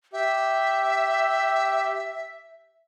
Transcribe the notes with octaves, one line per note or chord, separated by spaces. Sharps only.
G4 E5